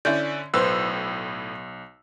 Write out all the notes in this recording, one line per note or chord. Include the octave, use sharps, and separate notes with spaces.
D3 C#4 E4 D5 G6
B1 A2 B4 C5 C6 E6